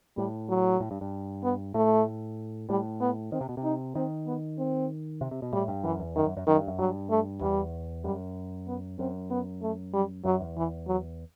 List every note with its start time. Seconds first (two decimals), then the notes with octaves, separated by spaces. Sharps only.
0.17 A2 G3
0.49 F#3
0.80 A2
0.91 G2
1.01 G2
1.43 B3
1.74 A2 A3
2.69 A2 G3
3.00 B3
3.32 D#3 C4
3.41 C3
3.49 B2
3.57 C3
3.64 D#4
3.95 D#3 C4
4.26 B3
4.58 C4
5.21 C3
5.31 C3
5.42 B2
5.53 A2 G3
5.68 G2
5.84 F#2 E3
5.99 E2
6.15 F#2 D#3
6.26 F#2
6.37 F#2
6.47 F#2 D#3
6.57 G2
6.68 F#2
6.79 G2 F#3
7.10 A3
7.41 E2 G3
8.04 F#2 G3
8.67 B3
8.99 F#2 C4
9.30 B3
9.62 A3
9.94 G3
10.25 F#2 F#3
10.40 E2
10.57 E3
10.87 F#3